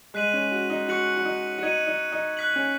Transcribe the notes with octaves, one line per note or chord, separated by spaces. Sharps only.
G#3 F#6 B6 D#7 F#7
C#4
F#4
D#4
F#4 C#6 F#6 C#7 F#7
F#4
D#4
F#4
D#4 G#6 D#7 F#7
D#4
D#4
F#6 B6 F#7
C#4